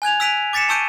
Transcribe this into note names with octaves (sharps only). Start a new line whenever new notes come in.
G#5 F#6 G#6 F7
E6 F#6 B6 D7 D#7 F7
D6 A6 B6 C#7 E7
A5 C#6 E6 G6 D7 D#7